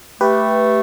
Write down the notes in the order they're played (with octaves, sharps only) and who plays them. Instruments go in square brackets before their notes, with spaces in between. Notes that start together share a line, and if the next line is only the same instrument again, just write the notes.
[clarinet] A3 [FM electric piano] G4 B4